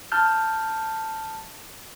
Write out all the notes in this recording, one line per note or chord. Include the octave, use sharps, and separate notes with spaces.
A5 F6 G6